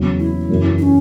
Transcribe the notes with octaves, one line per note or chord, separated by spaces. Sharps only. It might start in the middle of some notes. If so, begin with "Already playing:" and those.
Already playing: E2 C#3 F#3
E4
F#2 C#3 E3
E4
C#4